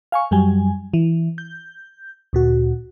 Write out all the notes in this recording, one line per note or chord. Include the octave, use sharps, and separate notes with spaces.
F5 G#5 C#6
F#2 F#3 G3 G#5
E3
G6
D2 A#2 F#4